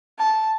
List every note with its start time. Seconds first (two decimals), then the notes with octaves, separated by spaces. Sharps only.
0.18 A5